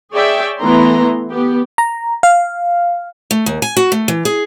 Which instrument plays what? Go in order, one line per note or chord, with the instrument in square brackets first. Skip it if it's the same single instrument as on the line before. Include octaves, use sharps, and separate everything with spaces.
[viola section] G#4 C#5 D5 E5 G5
E3 A3 B3 A#5 C6
B3 G4
[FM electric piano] A#5
F5
[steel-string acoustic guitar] A3
D#2
G#5
F#4
A3
E3
G#4